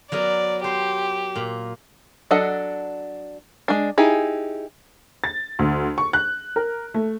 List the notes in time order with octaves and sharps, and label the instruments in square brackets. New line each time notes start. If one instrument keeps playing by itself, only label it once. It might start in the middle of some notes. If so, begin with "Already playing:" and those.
[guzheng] F#3 B3 A#4 [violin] D5
[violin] G4 [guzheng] C5
[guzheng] A#2
[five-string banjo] F#3 D4 A4 D#5 F#5
G#3 D4
D#4 E4 G4 G#4
[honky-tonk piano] A6
D2
C#6
F#6
A#4
A3